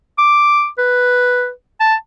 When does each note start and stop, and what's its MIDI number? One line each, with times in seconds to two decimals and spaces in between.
0.18 0.68 86
0.78 1.50 71
1.80 1.95 81